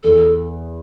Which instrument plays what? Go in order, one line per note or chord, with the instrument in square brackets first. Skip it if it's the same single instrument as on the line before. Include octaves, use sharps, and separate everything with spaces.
[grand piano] E2 [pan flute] A4